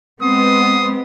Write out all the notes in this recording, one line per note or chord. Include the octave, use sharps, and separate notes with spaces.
G#3 B3 C4 C6 D#6